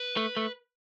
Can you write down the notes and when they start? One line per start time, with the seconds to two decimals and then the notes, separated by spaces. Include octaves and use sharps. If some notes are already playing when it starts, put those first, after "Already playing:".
Already playing: B4
0.17 A3
0.37 A3